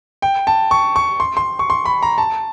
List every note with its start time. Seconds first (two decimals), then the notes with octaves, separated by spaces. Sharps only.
0.22 G5
0.47 A5
0.71 C#6
0.96 C#6
1.20 C6
1.37 C6
1.59 C#6
1.70 C6
1.85 B5
2.02 A#5
2.18 A5